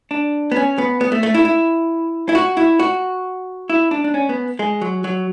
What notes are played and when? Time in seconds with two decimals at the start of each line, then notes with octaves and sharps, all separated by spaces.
0.11 D4
0.52 B3
0.56 C#4
0.78 B3
1.01 B3
1.12 A3
1.23 A3
1.34 E4
1.45 E4
2.29 E4
2.35 F#4
2.57 E4
2.79 F#4
3.70 E4
3.91 D4
4.04 D4
4.14 C#4
4.29 B3
4.59 G#3
4.81 F#3
5.04 F#3